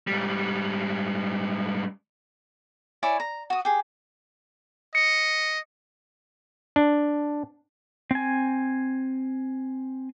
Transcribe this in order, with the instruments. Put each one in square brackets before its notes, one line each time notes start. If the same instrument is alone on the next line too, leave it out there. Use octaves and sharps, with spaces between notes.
[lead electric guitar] G#2 G3
[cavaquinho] E4 C#5 D5 G#5
A#5
F#4 D#6
G4 G#4
[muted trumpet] D#5 [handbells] C#7
[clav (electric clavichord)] D4
[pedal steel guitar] C4 G#5